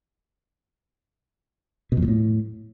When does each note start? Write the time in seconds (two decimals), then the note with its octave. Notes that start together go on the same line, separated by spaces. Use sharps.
1.92 B2
1.97 F2
2.02 A#2
2.08 A2